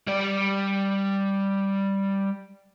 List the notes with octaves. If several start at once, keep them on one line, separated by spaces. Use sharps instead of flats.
G3 D5